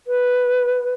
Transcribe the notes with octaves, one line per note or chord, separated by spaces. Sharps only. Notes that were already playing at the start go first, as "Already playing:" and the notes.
B4